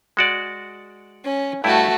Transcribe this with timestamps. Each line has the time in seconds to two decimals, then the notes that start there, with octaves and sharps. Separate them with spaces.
0.17 G#3 F#4 D5
1.25 C#4
1.64 G2 A3 E4 F#4 G4